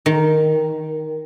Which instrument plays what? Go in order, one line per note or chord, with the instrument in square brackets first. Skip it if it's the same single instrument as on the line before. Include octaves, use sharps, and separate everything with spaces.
[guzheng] D#3